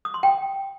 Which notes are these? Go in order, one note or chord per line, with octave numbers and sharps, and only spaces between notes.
D#6
C6
G5